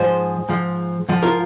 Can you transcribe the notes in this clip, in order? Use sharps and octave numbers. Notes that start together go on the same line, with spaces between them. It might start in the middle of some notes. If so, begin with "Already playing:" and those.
Already playing: G#2 F3 G#4 C5
G#2 F3
G#2 F3
F4 A#4